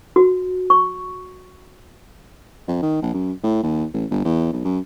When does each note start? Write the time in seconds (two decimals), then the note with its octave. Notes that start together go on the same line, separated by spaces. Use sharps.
0.16 F#4
0.70 C#6
2.68 F2
2.82 D#3
3.02 A#1
3.14 F#2
3.44 A2
3.63 D#2
3.93 A1
4.11 G1
4.25 E2
4.53 B1
4.64 F#2